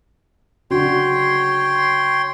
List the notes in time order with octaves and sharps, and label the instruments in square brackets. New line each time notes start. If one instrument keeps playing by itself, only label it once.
[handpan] C#3 D4 F#4 [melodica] C#5 G5 C6